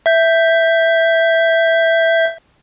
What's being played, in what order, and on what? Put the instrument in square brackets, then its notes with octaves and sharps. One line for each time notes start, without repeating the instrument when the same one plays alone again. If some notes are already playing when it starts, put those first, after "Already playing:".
[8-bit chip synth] E5 G6